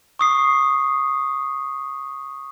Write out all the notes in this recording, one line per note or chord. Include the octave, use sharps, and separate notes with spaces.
C#6 D#6 C7